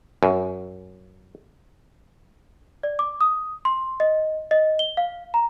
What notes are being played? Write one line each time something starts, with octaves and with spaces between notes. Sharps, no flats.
F#2
D5
D6
D#6
C6
D#5
D#5
G7
F5
A#5